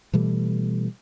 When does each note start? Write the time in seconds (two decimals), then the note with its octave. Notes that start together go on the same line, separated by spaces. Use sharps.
0.14 B2 E3 G3 A3